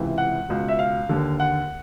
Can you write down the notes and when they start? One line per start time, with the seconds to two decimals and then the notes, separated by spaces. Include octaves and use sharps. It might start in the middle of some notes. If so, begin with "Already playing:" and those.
Already playing: C#2 C3 E3
0.18 F#5
0.48 C#2 B2
0.68 E5
0.79 F5
1.09 D#2 D3
1.40 F#5